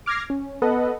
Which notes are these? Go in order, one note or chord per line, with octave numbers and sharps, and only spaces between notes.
D6 F6 G#6 A#6 C7
C#4
B3 A4 B4 D#5 F#5